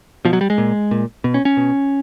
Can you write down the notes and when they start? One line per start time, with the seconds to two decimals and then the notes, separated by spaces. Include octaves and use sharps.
0.25 B2 F3
0.33 F#3
0.41 G3
0.50 G#3
0.58 A#2
0.91 A#2
1.24 B2
1.34 C#4
1.45 C#4
1.57 B2